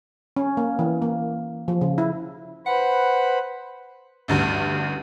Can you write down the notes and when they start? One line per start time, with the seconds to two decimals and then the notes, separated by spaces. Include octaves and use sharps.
0.37 C#4
0.57 A#3
0.79 E3
1.02 A#3
1.68 F3
1.81 C#3
1.98 E4
2.67 B4 C5 F#5 B5
4.28 A1 D2 G2